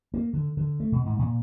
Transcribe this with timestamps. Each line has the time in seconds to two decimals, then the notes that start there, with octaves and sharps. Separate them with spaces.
0.14 A#3
0.33 D3
0.57 D3
0.80 A3
0.92 B2
1.05 G#2
1.19 A#2